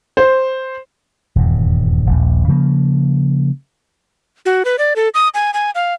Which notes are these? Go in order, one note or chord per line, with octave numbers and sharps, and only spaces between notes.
C5
D#1 E2 G2
D#1 A#1
C#3 F3 G3 A#3
F#4
B4
D5
A4
D#6
G#5
G#5
F5